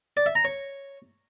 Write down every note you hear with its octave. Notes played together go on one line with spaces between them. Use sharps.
D5
E5
A#5
C#5